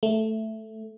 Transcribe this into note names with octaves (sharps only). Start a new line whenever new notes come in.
A3